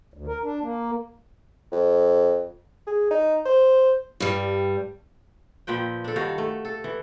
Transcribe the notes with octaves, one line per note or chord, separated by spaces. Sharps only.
D2
A#4
D4
A#3
F2
G#4
D#4
C5
G2 G3
A#2 F3 B4 G5
D4 A4
G2 D#3 F#4 F5
A3
A4
E3